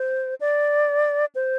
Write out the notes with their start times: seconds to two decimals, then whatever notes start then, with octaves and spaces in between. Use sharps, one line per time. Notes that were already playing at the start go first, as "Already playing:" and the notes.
Already playing: C5
0.41 D5
1.35 C5